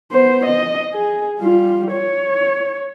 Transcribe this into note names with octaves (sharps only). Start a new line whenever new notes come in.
B3 C5
D#5
G#4
G3 F4
C#5